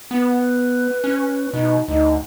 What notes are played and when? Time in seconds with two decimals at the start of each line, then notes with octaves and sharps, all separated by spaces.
0.11 B3 B4
1.04 C#4
1.53 B2 D#4
1.88 D2 D#4